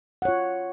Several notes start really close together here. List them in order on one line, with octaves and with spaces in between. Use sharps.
F#5 C#5 F4